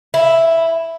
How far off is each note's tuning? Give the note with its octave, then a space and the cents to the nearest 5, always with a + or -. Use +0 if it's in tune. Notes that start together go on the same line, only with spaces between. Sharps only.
E4 +0